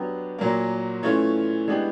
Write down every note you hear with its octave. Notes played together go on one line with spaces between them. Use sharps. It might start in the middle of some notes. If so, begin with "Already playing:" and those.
Already playing: F#3 B3 D4 G4
A#2 F#3 A#3
E3 A3 C#4 F4
E3 G#3 B3 D4 G4